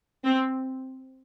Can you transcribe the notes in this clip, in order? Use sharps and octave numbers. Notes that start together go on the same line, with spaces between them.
C4